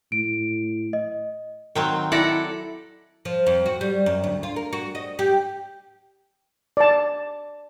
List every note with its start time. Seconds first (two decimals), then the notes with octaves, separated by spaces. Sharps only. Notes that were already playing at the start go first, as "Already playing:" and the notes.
0.12 A2 D7
0.93 D#5
1.75 D#3 F#3 C4
2.12 E4 A4 D5 F#5 A#6
3.25 F3
3.47 F2
3.66 F#4
3.81 G3
4.06 F#2
4.24 D2
4.43 F4
4.56 A#4
4.73 F#4
4.95 D#5
5.19 G4
6.77 D5 A5